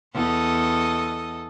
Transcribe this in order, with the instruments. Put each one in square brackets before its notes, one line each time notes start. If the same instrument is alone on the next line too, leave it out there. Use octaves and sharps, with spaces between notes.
[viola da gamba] E2 A4 D#5